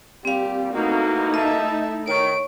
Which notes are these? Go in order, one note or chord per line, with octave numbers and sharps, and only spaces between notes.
A#2 G3 C4 G4 F5
B2 A3 A#3 D#4 E4 F#4
D#5 E5 A5
D#3 C#5 C#6 D7